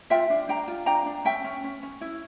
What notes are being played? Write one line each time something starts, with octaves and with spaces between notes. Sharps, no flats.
F4 E5 G5
D4
D4 G5 A#5
F4
D4 G5 A#5
D4
C#4 E5 G5
C#4
C#4
C#4
E4